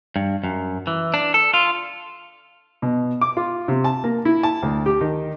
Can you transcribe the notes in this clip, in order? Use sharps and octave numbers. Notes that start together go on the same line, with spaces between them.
G2
F#2
E3
D4
A4
F4
B2
D6
F4
C3
A5
A#3
E4
A5
D2
G4
D#3